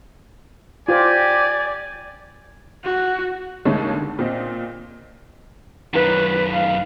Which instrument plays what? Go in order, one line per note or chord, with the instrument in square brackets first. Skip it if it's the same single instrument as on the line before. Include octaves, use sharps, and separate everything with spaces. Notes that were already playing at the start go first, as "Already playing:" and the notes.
[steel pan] F4 C5 [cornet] G4 [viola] D5 [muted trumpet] G#5
[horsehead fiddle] F#4
[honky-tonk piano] D#2 C#3 G#3 A3 C#4
D3
A#2 C4 D#5
[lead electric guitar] F#2 D#3 [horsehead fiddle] B4
[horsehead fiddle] F5